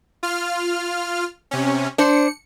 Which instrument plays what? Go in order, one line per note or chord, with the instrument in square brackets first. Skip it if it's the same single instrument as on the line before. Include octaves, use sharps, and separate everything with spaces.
[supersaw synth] F4 F6
C3 C#4
[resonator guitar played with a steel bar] D4 C5 [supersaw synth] C#7